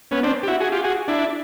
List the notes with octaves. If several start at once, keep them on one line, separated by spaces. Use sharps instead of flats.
B3 C#4
C4 D4
G4
E4 F#4
F#4 G#4
F4 G4
F#4 G#4
D4 E4